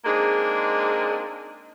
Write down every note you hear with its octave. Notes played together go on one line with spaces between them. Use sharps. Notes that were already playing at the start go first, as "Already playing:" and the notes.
G#3 A#3 C4 D4 D#4 G#4